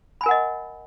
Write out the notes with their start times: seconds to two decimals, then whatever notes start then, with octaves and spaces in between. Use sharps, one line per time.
0.21 B5
0.23 G#5
0.26 A#4
0.28 F#5
0.31 D#5